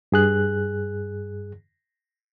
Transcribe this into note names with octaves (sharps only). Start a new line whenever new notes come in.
G2 G#4 F#6